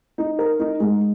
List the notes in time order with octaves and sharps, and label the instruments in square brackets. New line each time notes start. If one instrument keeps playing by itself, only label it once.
[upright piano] D#4
A#4
D#4
G#3